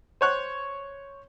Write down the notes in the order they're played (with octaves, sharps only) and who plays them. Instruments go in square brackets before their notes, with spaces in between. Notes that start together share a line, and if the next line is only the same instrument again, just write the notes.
[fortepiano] C5 C#5 F#6